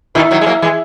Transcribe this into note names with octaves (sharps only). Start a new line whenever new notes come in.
B2 D#3 E4
D#3 F#3
G#3
F#3 A#3
E3 G#3